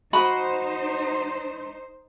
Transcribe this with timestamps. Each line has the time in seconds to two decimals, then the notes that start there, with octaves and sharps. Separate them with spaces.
0.13 D#4 F#4 C5 D#5 B5